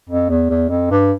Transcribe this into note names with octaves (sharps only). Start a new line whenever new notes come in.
F2
E2
E2
F2
G2